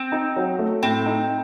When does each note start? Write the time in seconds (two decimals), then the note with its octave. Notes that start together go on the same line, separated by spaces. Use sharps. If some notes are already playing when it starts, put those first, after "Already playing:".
Already playing: C4
0.12 D#4
0.36 F#3
0.59 A3
0.83 A2 C4
1.06 D#4